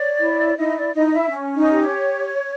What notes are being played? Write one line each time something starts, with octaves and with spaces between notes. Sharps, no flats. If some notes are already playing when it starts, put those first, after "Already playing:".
Already playing: C#5 D5
E4
D#4 E4 D#5
D5
D#4 E4 D#5
E4 E5
C#4
D#4 D#5
G4
C#5